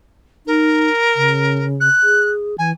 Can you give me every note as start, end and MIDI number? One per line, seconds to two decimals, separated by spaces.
0.47 0.89 63
0.47 1.63 70
1.16 1.88 49
1.80 2.29 90
2.03 2.58 68
2.58 2.72 52
2.58 2.70 80